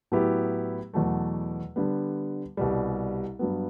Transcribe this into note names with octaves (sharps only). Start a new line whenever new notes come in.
A2 F#3 B3 E4 G4
E2 B2 F#3 A3
D3 G3 B3
C2 B2 G3
G2 F#3 B3